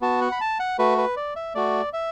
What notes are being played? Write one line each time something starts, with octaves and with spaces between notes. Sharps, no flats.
B3 F#4 A5
F#5
B5
A5
F#5
A3 F#4 B4
B4
D5
E5
A3 F#4 D5
E5